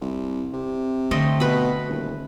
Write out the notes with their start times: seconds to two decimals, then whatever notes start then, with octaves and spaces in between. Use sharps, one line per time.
0.01 C2
0.53 C3
1.11 D3 A3 C4 D#5
1.40 B2 B4 B5
1.88 D#1